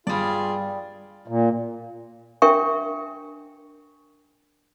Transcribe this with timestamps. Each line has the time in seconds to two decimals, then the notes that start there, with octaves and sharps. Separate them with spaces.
0.07 G2 G3 F4 G#4 D5
1.28 A#2
2.42 D4 A#4 E5 G5 C#6